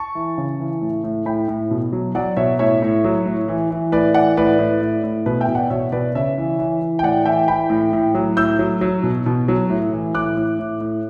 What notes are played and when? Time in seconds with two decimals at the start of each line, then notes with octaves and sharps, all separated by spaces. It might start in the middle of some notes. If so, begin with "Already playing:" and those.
Already playing: A5 C#6
0.15 E3
0.38 C#3
0.59 E3
0.81 A2
1.04 A2
1.26 A2 G5 B5
1.48 A2
1.71 B2
1.93 F#3
2.15 F#3 D5 F#5
2.37 B2 C#5 E5
2.59 A2 C#5 E5
2.82 A2
3.04 F#3
3.26 A2
3.48 E3
3.70 E3
3.92 A2 B4 D5
4.14 E3 D5 F#5
4.37 A2 B4 D5
4.59 A2
4.82 A2
5.04 A2
5.26 B2 B4
5.41 E5 G5
5.48 B2
5.55 D5 F#5
5.70 B2 C#5 E5
5.92 B2 B4 D5
6.15 C#3 C#5 E5
6.38 E3
6.59 E3
6.82 E3
6.99 G5
7.03 A2 D5 F#5
7.25 E3 E5 G5
7.48 E3 G5 B5
7.70 A2
7.93 A2
8.15 F#3
8.37 A2 E6 G6
8.59 F#3
8.81 F#3
9.03 B2
9.26 B2
9.48 F#3
9.70 A2
9.92 E3
10.15 A2 D6 F#6
10.37 A2
10.59 A2
10.81 A2